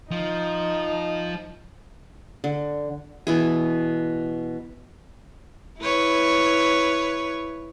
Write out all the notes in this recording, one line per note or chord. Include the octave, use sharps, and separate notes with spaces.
F3 D#4
D3
B2 E3 G#4
E4 B4 C#5